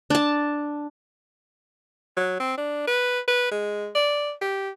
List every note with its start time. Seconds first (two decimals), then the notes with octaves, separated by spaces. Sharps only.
0.10 D4 A5
2.16 F#3
2.40 C4
2.57 D4
2.87 B4
3.27 B4
3.51 G#3
3.95 D5
4.41 G4